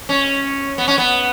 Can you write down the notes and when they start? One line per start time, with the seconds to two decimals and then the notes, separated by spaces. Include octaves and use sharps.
0.09 C#4
0.78 B3
0.88 C#4
0.98 B3